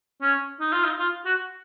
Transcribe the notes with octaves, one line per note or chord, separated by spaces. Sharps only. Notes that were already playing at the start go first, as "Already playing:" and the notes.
C#4
D#4
F4
D#4
F4
F#4